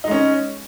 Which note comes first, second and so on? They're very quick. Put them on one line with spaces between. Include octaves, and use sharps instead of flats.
D#4 G#3 C#4